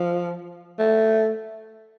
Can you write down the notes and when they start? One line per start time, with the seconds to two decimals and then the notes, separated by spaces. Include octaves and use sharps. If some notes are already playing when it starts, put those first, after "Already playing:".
Already playing: F3
0.79 A3